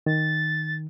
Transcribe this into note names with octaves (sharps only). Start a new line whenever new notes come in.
D#3 A6